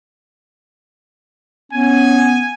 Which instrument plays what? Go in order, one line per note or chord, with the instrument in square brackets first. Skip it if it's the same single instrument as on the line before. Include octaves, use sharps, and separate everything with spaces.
[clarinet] B3 [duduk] C#4 [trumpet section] G#5